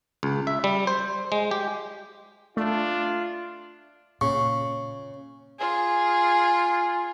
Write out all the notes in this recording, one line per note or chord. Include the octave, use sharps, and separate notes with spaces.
C#2
E5
G3
C5
G#3
G4
A3 D4 F4
A#2 C#3 C#6
F4 G#4